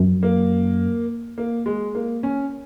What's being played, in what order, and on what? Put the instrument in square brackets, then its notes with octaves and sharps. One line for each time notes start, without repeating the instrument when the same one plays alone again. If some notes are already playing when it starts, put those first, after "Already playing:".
Already playing: [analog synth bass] F#2
[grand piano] A#3
A#3
G#3
A#3
C#4